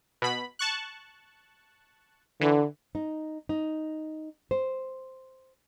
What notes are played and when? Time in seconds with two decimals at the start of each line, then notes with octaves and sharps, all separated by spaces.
0.22 B2 B5
0.59 A5 C#6 F#6
2.41 D3 E3
2.95 D#4
3.49 D#4
4.51 C5